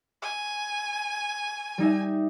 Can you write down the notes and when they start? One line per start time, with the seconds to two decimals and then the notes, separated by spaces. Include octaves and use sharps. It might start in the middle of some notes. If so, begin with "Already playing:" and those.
0.22 G#5
1.78 G3 D#4 E5